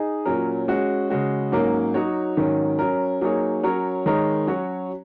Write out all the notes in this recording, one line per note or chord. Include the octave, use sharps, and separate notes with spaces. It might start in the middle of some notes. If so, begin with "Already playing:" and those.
Already playing: D#4 G#4 D#5
A#2 F#3 C#4 A#4
G#3 C#4 F#4
C#3 G#3 F#4
G#2 F#3 A#3 C#4 A#4
F#3 D#4 F#4 C#5
G#2 D#3 F#3 C#4
F#3 C#4 A#4
F#3 A#3 D#4 G#4 C#5
F#3 C#4 A#4 C#5
D#3 G#3 D#4 A#4 C#5
F#3 C#4 F#4 C#5